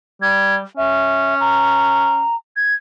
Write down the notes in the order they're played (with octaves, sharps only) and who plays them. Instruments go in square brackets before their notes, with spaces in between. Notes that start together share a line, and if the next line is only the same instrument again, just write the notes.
[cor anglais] G3 [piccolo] G#6
[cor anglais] C#4 [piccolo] E5
[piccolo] A#5
G#6